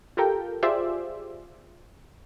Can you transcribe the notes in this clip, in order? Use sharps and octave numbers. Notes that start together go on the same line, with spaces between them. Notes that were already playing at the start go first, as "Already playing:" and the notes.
F4 G4 A4 A#4 G5
F4 G4 G#4 C5 D5 E5